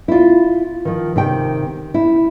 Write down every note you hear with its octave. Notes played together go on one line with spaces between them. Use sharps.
E4 F4
D#3 F3
C3 D#3 G5
E4